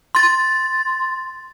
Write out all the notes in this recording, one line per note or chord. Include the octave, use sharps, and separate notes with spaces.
C6 A6